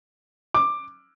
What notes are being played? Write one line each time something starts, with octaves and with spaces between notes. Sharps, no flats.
D6